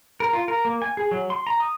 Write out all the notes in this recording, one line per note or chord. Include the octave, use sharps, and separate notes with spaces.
A#4
F4
A#4
A#3
G#5
G#4
F#3
C6
A#5
D#6